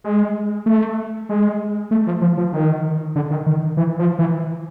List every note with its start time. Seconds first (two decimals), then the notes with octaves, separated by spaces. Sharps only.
0.04 G#3
0.66 A3
1.29 G#3
1.91 A3
2.07 F3
2.22 F3
2.37 F3
2.53 D#3
3.16 D3
3.30 D#3
3.46 D#3
3.77 E3
3.99 F3
4.19 E3